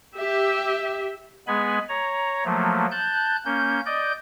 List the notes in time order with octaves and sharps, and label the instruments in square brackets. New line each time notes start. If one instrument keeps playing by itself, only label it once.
[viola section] G4 E5
[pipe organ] G#3 B3 G#4 G#5 B5
C#5 A#5
F3 F#3 A3 A#3
A5 F#6 G6
A#3 C#4 G6
D5 D#5 G6